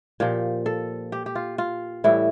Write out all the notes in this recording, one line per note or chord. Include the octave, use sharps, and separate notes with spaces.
A#2 F3 G4
A4
G4
G4
F4
F4
A2 E3 G3 E4